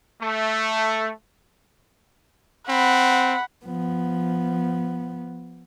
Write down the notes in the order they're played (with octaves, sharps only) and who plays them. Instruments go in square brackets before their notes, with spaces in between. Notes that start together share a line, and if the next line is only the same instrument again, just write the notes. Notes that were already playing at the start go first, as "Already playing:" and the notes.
[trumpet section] A3
[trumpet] C4 [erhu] F#5 [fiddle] B5
[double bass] F3 B3